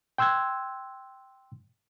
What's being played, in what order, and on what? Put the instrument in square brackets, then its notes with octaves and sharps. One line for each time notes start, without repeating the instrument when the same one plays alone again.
[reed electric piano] G5 C6 E6 F#6 G#6